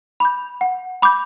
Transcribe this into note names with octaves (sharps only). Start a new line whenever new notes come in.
B5 D6 G6
F#5
B5 D6 G6